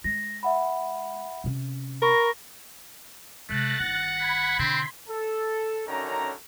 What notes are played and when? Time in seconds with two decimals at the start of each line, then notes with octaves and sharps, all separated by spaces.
0.04 G#3 A#6
0.43 E5 F#5 B5
1.44 C3 C#4
2.02 A#4 B5 C#6 A#6
3.49 C3 G#3 A3 F#6 A6 A#6
3.80 G1 D#3 F#5
4.16 B5 G#6 B6
4.59 B2 D3 C4 C6
5.09 A4
5.87 F#2 D3 D#3 C#4 A#5